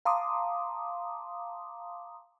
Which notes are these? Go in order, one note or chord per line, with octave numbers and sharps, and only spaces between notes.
F5 A5 A#5 C6 D6 D#6